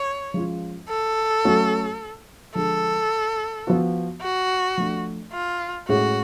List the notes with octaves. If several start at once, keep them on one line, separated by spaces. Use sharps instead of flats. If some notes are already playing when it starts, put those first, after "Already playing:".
Already playing: C#5
F3 G#3 C#4 F4
A4
F#3 A3 C#4 F#4
D3 F3 G#3 A4
F3 B3 F#4
F#4
F3 A3 D4
F4
A2 G#3 C#4 F#4 G#4